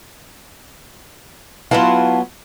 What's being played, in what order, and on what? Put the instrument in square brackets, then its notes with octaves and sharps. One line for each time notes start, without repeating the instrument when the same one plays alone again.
[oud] F#3 B3 F4 [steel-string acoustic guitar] E4 F5 A5